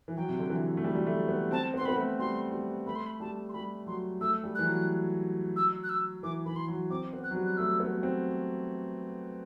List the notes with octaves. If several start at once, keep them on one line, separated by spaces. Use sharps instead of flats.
E3
F#3 G5
C3
D3
E3
A3
G3
G3
A3
B3
C4 A5
B3
C6
C4
B3 B5
A3
G3 C6
G3
A3 B5
C6
B5
G3 A5
C6
G3 B5
F#3 C6
A3 E6
G3
E3 F#6
F#3
E6
F#6
E6
E3 D6
E3 B5
C6
F#3
C4 D6
B3
F#6
F#3
G3
F#6
A3 E6
B3
C4